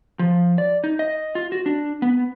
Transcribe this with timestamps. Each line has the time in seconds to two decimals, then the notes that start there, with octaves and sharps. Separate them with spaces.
0.19 F3
0.58 D5
0.84 D#4
0.99 D#5
1.35 F4
1.52 F#4
1.66 D4
2.02 B3